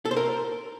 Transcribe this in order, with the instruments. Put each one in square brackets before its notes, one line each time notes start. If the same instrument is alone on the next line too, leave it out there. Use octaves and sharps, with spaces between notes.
[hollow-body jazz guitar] A4
C5
A#4